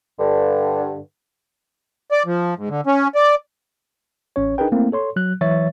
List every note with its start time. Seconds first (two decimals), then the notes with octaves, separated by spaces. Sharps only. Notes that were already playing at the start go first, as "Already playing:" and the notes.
0.19 G2 D3
2.12 D5
2.26 F3
2.58 G#2
2.69 D3
2.87 C#4
3.15 D5
4.36 A1 C#4 C#5
4.58 D4 D#4 G#4 A#4 B4 G5
4.72 A3 A#3 C4 E4
4.92 A4 C#5 C6
5.16 F#3 F#6
5.41 E3 F#3 C#5 E5 A6